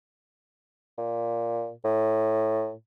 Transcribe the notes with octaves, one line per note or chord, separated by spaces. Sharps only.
A#2
A2